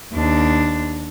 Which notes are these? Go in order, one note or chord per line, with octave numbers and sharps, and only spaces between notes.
D#2 D4